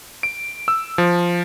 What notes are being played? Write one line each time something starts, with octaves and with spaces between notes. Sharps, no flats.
D7
E6
F3